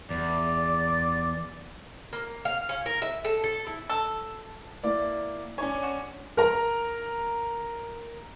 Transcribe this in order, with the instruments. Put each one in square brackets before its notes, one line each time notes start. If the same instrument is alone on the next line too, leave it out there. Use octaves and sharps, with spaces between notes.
[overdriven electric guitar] E2 [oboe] D5
[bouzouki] A#3
F5
C#4
A#4
E5
A4
A4
E4
[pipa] A4
[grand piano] A#3 E4 D5
[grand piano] C#4 D4 G#5 [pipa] C#5
[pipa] F#4
[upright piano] A#4 A#5